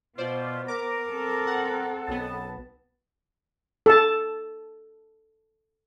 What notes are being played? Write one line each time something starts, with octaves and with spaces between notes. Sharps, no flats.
B2 B3 F4 C5 D5
A#4 A#5 D6
C4 A4
F#5
B1 F#2 B3 C4 A5
A4 A5